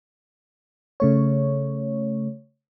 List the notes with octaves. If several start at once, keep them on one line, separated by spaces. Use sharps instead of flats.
C#3 A3 C#5